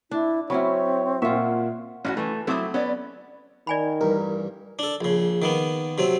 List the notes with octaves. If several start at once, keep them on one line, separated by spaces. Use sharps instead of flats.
D4 E4
F#3 C4 C#4 E4 C#5 B5 C#6
A#2 A#3 F4 E5 F#5 C#6
A1 C#4 E4 F#4
E3 A3 G#5
F#3 A3 C4 E4 D6 D#6
B3 C#4 D5
D#3 D5 G#5 B5
A1 G2 A#4
D4 A4
A#1 C#3
D#3 A#3 B3
C3 F#3 C4